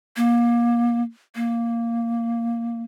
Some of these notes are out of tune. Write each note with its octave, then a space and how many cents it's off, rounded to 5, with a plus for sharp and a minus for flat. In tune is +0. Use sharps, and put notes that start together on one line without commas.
A#3 +25
A#3 -5